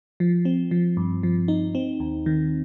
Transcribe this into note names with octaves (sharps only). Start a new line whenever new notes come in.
F3
C4
F3
G2
F3
D#4
C4
D#2
D#3